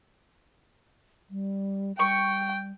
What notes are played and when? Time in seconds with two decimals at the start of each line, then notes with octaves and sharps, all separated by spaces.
1.30 G3
1.99 G3 G5 C#6